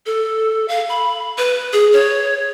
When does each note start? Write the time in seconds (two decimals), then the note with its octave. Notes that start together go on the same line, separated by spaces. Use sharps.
0.06 A4
0.68 F5
0.89 B5
1.38 B4
1.73 G#4
1.93 C#5